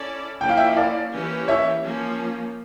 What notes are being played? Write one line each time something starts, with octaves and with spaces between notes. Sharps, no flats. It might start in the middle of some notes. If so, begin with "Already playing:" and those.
Already playing: C#4 E4 A4 D5
F3 A#3 C#4 E4 G5
F5
E5 G5
D5 F5
E3 A#3 C#4 G4
C#5 E5
F3 A#3 C#4